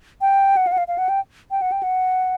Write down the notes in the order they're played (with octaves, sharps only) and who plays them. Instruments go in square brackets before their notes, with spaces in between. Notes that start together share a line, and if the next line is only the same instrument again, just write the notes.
[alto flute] G5
F#5
F5
F#5
F5
F5
F#5
G5
G5
F#5
G5
F#5